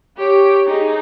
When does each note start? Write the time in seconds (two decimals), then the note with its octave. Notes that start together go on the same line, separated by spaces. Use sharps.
0.17 G4 C#5
0.66 D#4 G#4